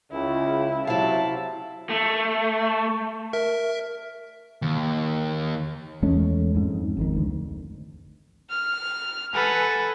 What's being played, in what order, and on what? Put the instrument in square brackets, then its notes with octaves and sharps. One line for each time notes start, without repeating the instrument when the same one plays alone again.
[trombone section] C#2 C#3 [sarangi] E4
[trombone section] C3 F#3 [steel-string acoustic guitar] E4 F5 [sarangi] A5
[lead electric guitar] A3
[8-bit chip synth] A#4 E5
[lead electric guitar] D#2
[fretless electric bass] E2 G#3 A3 C#4
F2 G#2
G#1 F2 D#3
D2
[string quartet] F6
A4 B4 F#5 G#5